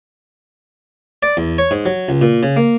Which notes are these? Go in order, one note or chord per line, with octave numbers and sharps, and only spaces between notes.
D5
E2
C#5
G#2
F#3
C#2
A#2
C#3
A#3